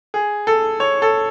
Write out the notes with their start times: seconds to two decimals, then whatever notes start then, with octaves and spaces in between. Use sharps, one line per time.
0.14 G#4
0.47 A4
0.80 C#5
1.02 A4